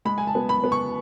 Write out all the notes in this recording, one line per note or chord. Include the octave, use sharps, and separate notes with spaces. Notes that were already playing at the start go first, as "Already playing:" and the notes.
G#3 B5
G#5
A5
B3
B5
B3
C#6